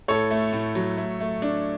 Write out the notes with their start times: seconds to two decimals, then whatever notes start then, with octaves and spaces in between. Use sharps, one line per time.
0.08 A2 A4 C#5
0.31 A3
0.53 A2
0.75 F#3
0.97 A3
1.20 A3
1.42 D4